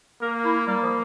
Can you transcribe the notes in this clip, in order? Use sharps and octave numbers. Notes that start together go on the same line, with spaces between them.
A#3 A#4
E4
G3 A#3
F3